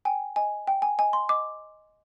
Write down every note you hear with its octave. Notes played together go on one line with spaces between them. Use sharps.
G5 G#5
D#5 G#5
G5
G#5
D#5 G#5
C6
D#5 D6